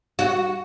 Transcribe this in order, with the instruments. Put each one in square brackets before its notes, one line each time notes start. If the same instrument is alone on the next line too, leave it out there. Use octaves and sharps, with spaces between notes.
[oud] F#4